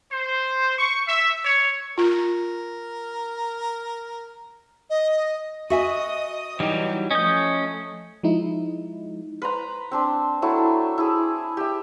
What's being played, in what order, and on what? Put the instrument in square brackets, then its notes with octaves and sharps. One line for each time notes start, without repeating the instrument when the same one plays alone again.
[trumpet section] C5
C#6
E5
C#5
[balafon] F4 [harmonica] A#4
[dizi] D#5
[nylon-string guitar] F#4 E5 G#5 [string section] D#5 D#6
[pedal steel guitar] E3 F#3 G3 [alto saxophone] D#4 [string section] G4
[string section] F3 A3 [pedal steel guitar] C#4 G6 [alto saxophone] D#5
[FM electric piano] F3 G#3 D#4 E4
[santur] B4 C5 A#5
C4 D4 C5
F#3 A3 E4
E4 G#4
G4 E5